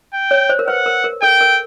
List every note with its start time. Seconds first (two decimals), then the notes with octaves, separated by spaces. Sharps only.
0.13 G5
0.31 C#5
0.49 C5
0.59 A#4
0.68 B4 F#5
0.86 A#4
1.04 A#4
1.22 A4 G5
1.41 A#4